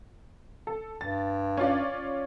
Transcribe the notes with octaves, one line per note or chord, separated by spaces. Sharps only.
A4
G2 A6
C#4 F4 D5